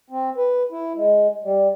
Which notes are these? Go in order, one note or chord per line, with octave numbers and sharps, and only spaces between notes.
C4
B4
E4
G#3
G3